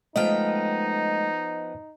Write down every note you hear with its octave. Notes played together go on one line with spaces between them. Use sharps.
F3 G#3 A3 B3 D#4 D#5 F5 G5